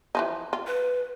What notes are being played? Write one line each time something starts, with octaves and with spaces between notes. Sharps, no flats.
E3 F3 D#4
F4
B4